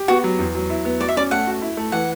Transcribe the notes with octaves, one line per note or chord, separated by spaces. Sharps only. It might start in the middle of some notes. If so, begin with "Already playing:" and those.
Already playing: G4
B3 F#4
F#3
E2
F#3
E4
B3
F#4 D5
E5
C#4 D5
A3 F#5
F#4
E4
A3
E3 F#5